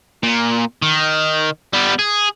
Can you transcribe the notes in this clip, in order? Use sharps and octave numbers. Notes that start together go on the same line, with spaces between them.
A#2
D#3
G3 B3
G#4